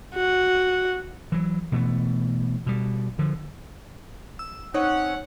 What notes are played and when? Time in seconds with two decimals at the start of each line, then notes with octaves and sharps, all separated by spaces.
0.15 F#4
1.32 E3 F#3
1.72 B2 E3 A3
2.66 B2 G3
3.19 D3 F3
4.39 E6
4.74 C4 C#4 D#4 C#5 F#5